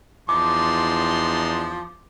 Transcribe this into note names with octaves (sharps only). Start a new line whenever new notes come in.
E2 F3 D4 D#4 C6 D6